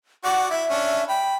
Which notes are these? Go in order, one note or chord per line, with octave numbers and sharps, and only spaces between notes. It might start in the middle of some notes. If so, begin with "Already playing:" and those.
F#4 D5 F#5
E4 E5
C#4 D4
G5 B5